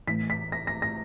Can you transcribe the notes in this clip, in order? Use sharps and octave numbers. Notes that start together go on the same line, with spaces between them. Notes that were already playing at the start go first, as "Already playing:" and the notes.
A2 E3 B6
B6
A#6
A#6
A#6